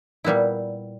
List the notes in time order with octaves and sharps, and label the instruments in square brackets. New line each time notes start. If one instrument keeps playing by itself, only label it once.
[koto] A#2 G3 B3 E4